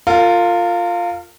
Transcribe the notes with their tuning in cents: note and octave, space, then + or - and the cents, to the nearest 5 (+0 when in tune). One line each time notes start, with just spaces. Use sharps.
F4 +0 A#4 -40